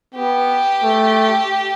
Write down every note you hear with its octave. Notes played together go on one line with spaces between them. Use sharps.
B3 G4
A3